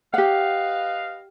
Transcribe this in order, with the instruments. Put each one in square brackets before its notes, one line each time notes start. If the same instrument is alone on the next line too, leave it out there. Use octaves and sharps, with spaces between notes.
[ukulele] G4 F#5 [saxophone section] B4 D#5 F5